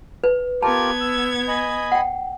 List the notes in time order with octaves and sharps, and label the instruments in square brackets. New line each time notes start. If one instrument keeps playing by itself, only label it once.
[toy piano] B4
[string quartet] B3 G#6 [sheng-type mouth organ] F4 G4 A#4 [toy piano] A5
[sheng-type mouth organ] E6
D#5 G#5 B5
[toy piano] F#5 G5